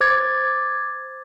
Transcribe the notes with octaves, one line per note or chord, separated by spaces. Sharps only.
C5 D6 G#6 A6